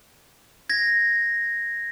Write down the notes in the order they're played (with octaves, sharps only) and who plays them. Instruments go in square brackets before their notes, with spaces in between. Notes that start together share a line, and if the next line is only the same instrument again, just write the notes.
[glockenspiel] G#6 A#6